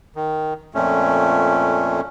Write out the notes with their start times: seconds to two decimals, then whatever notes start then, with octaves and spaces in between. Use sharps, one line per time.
0.16 D#3
0.75 F2 A#2 A3 C#4